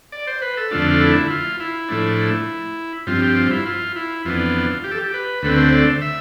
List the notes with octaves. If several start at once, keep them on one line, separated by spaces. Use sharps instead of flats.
D5
C5
B4
A4
F2 D3 A3 D4 F4
F4
E4
F4
E4
A2 F3 A3 D4
G2 F3 C4 F4
G4
F4
E4
F4
E4
F2 E3 B3 D4 F4
G4
A4
G4
B4
D2 D3 A3 C4 B4
C5
D5
E5